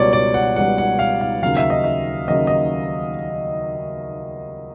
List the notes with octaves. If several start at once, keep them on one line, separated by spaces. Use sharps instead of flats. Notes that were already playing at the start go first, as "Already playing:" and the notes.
Already playing: C#2 B2 G3 C#5 D5
D5
F#5
C#2 B2 G3 F#5
F#5
F5
F5
D#2 C#3 F#3 F5
E5
D#5
E5
D#2 C#3 F#3 D#5
D#5